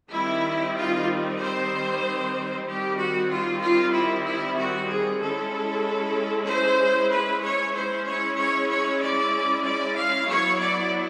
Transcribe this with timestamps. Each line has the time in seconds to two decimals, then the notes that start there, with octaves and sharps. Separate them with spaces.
0.12 D#3 G3 C4 D#4 E4
0.76 F4
1.39 C5
2.65 D#3 G3 C4 G4
2.98 F#4
3.30 F4
3.61 F4
3.93 E4
4.25 E4
4.57 F#4
4.88 G#4
5.19 G#3 C#4 E4 A4
6.46 C5
7.11 B4
7.41 C#5
7.73 G#3 C#4 E4 C5
8.05 C#5
8.37 C#5
8.68 C#5
9.00 D5
9.64 D5
9.96 F5
10.27 F#3 B3 E4 C#5
10.59 D5